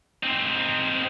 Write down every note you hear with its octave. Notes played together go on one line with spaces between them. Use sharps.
C4 D#4